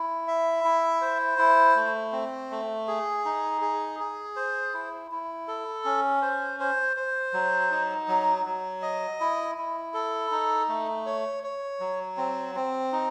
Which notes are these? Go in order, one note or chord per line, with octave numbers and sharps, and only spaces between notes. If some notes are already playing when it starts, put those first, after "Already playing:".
Already playing: E4
E5
E4
C5
E4
A3
C4
A3
G#4
D#4
G#4
G#4
C5
E4
E4
A4
C#4
C5
C5
C5
F#3
D#4
F#3
F#3
D#5
E4
E4
A4
D#4
A3
C#5
C#5
F#3
C4
C4
D#4